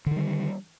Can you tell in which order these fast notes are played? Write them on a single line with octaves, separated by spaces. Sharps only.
D3 D#3 G3